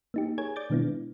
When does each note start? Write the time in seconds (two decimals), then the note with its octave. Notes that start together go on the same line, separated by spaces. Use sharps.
0.14 A#3 D#4 G4
0.38 G#4 A#4 C#5 G#5 G#6
0.56 D5 D6 G6 A6
0.70 B2 D#3 G#3 B3 D4 E4